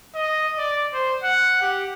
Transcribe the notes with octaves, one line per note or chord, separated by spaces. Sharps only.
D#5
D5
C5
F#5
G4